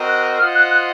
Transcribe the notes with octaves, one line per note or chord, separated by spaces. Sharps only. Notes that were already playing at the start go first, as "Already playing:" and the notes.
Already playing: C4 F#4 A#4 D#5
F#6
F4 C5 D#5 F#5 F6
F#6
F#6